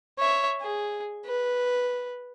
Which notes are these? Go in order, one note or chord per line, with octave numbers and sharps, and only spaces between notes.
C#5 E5
G#4
B4